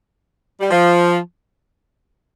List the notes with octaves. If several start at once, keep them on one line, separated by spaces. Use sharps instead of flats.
G3
F3